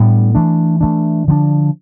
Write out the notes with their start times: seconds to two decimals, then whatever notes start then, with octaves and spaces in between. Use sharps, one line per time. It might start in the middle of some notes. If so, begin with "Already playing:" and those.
Already playing: A2 G3 B3 D4
0.35 E3 A3 D4
0.81 E3 A3 D4
1.27 D3 F3 A3 D4